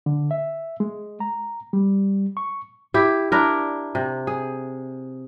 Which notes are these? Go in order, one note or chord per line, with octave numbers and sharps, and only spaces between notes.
D3
E5
G#3
A#5
G3
C#6
E4 G4
D4 E4 A#4
C3
G#4